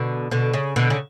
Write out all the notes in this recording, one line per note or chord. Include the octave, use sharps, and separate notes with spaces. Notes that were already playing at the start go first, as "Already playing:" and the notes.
Already playing: B2 D3
B2 D3
C#3
B2 D3
C#3